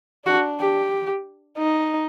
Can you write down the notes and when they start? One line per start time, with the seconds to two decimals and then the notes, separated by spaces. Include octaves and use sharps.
0.26 D4 F#4
0.59 G4
1.58 D#4